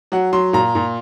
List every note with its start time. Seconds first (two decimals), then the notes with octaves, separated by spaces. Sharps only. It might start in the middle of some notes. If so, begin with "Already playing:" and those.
0.12 F#3 F#5
0.33 F#3 C6
0.53 A#2 A#5
0.75 A#2